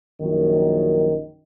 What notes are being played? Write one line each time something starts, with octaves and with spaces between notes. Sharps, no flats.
A#1 F#2 D#3